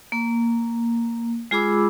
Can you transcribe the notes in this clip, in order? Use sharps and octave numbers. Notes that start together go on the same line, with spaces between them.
A#3
G#3 F4 G#4 B5 D6 E6